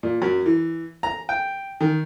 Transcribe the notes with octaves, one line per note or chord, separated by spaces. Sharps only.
A#2
F#2
E3
A#5
G5
D#3